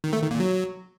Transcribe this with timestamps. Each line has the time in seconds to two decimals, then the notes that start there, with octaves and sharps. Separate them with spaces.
0.04 D#3
0.13 A3
0.22 D#3
0.31 A#2
0.40 F#3